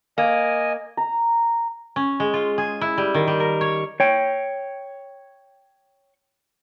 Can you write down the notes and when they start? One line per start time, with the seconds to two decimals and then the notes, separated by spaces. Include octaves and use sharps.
0.18 A#3 D#5 G#5
0.97 A#5
1.96 C#4
2.20 G#3
2.34 F4
2.58 G#4
2.81 E4
2.98 G3
3.14 D#3
3.27 G3
3.40 A#4
3.61 C#5
4.00 C#5 G5